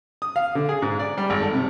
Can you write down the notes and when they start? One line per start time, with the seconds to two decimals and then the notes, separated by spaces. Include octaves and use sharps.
0.22 D#6
0.36 F5
0.55 D3
0.69 G#4
0.82 G#2
0.99 D5
1.18 G3
1.30 G#1
1.42 A4
1.54 C3